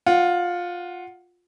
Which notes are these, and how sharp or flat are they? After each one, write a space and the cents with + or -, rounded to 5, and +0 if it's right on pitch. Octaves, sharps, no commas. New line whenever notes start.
F4 +15 F#5 +0